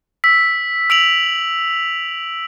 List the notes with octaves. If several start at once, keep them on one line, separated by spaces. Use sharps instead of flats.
E6 B6
E6 D7 F7 F#7